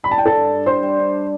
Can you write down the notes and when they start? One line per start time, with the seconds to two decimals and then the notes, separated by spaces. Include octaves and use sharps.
0.03 G3 B5
0.11 A5
0.18 G2 G5
0.26 A4 A5
0.36 G2
0.51 G2
0.66 G3 C5 C6
0.83 G3
0.99 D4